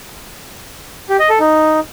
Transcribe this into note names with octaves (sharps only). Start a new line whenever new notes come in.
G4
D#5
A4
D#4